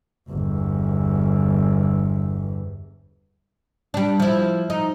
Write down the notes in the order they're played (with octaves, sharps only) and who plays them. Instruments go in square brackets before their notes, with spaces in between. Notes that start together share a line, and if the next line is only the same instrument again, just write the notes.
[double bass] G1 E2
[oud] G3 D4
F3 E4
D#4